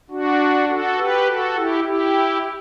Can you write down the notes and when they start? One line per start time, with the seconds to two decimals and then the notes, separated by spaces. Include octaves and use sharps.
0.10 D4 F#4
0.69 F#4 A4
0.97 G4 B4
1.26 F#4 A4
1.55 E4 G4
1.84 E4 G4